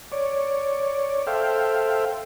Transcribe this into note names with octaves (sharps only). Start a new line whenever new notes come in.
C#5 D5
A4 C5 E5 F5 G5